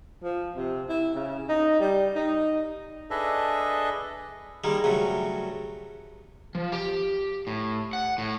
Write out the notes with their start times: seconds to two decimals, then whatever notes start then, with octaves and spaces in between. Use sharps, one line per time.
0.23 F3
0.55 C3
0.89 E4
1.15 C#3
1.49 D#4
1.80 G3
2.15 D#4
3.10 D4 G#4 A4 B4 D#5 E5
4.64 D#3 G3 G#3 A#3
4.84 G2 C#3 F#3 A3
6.55 F3
6.72 G4
7.47 A2
7.93 F#5
8.18 A2